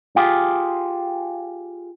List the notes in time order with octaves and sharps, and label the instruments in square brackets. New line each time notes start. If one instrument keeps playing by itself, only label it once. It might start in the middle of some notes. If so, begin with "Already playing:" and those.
[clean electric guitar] F4 G4 G#4